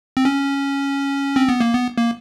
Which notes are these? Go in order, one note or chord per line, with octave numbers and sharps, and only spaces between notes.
C4
C#4
C4
B3
A#3
B3
A#3